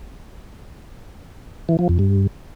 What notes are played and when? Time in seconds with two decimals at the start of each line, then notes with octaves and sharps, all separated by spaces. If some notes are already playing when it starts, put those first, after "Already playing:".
1.69 E3
1.79 F3
1.89 F2
1.99 G2